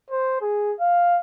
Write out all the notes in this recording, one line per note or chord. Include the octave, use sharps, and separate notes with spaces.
C5
G#4
F5